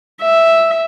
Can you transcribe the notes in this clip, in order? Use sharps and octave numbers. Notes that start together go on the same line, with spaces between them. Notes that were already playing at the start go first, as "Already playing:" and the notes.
E5